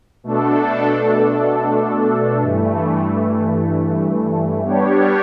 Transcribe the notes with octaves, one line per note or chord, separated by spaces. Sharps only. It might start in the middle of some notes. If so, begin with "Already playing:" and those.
B2 A3 D4 A4
G2 E3 A3
G3 B3 D4 G4 C#5